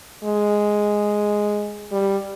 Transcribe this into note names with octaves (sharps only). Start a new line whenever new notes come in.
G#3
G3